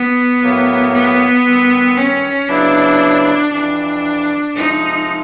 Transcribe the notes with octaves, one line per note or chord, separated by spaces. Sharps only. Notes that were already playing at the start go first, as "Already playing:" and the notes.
Already playing: B3
A2 F#3 A#3
B3
G2 D#3 G3 C4
C#4
C#3 F#3 B3 D4 E4
F2 C3 E3 D4
C3 F3 G#3 D#4